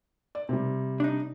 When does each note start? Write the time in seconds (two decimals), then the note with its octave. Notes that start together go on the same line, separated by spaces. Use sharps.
0.35 D5
0.49 C3 G3
1.00 D4 D#4